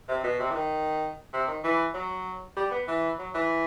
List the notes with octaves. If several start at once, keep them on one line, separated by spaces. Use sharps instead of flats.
C3
B2
C3
E3
D#3
C3
D#3
E3
F#3
G3
B3
E3
F#3
E3